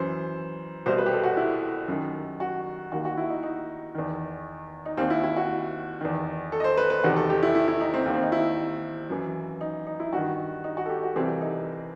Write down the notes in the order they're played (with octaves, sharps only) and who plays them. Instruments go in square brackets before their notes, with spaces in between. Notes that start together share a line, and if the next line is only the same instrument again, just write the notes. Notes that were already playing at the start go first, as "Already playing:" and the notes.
Already playing: [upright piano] F#2 E3 C5
C2 B2 C5
B4
G4
A4
F#4
E4
F#2 D#3
F#4
D#2 D#3 F#4
F#4
E4
D#4
D#4
E2 D#3
D#4
D#2 D#3 C4
E4
E4
F#4
E2 D#3
A4
D#5
C5
B4
B4
E2 C3 D#3 F#4
A4
G4
E4
E4
E4
D#4
C4
D#2 D#3
C4
D#4
E4
F#2 E3
D#4
D#4
E4
G2 D#3 F#4
D#4
F#4
A4
G4
F#4
C2 C3 E3 C4
D#4